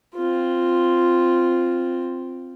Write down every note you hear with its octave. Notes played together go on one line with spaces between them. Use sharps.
C4 F4